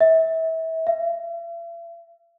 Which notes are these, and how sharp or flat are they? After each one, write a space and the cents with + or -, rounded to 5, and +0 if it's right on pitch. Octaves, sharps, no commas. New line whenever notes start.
E5 -30
E5 +45